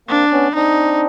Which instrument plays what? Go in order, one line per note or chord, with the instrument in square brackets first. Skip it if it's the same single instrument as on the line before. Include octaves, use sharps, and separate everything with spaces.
[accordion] A#3 C4 [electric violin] D4
[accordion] B3 C#4
[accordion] C4 D4 [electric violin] D#4